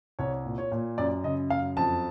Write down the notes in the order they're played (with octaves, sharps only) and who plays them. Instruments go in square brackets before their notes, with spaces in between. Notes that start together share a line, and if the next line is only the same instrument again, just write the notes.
[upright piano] C2 C#5
A#2
C#5
A#2
F#2 D5
C#3 D#5
F#2 F5
F2 A5